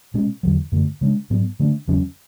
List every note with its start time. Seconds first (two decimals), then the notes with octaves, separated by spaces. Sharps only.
0.14 B2 G#3 C#4
0.43 E2 D3 F#3
0.72 F#2 D3 A3
1.01 C#3 G#3 D4
1.30 G#2 F#3 B3
1.60 D3 A3 D4
1.88 E2 C#3 F#3 C#4